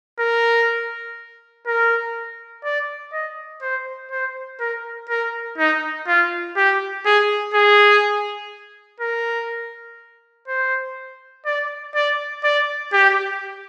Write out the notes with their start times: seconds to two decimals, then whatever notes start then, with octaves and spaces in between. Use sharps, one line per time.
0.19 A#4
1.67 A#4
2.64 D5
3.13 D#5
3.62 C5
4.11 C5
4.60 A#4
5.10 A#4
5.58 D#4
6.07 F4
6.57 G4
7.06 G#4
7.54 G#4
9.01 A#4
10.48 C5
11.46 D5
11.95 D5
12.44 D5
12.93 G4